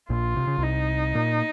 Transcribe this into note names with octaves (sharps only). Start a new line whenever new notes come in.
A#1 A#2 F4
C3
C#3
C2 C3 D#4
A#2 A#3